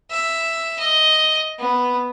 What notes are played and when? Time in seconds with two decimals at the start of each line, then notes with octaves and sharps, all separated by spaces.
0.11 E5
0.79 D#5
1.59 B3